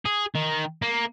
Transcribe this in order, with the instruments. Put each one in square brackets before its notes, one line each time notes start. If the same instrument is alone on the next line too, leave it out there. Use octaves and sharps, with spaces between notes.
[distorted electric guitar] G#4
D#3
A#3